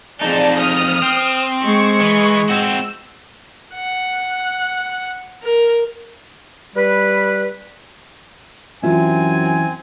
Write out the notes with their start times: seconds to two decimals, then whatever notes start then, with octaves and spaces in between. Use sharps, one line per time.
0.21 F2 D#4 G#4 D5 A5
0.57 D#6 F6
1.02 C4
1.64 G#3 C#6
2.01 E3
2.49 C4 F#4 E6
3.75 F#5
5.43 A#4
6.75 G3 B4
8.83 F#2 E3 C4 F4 E5 G#5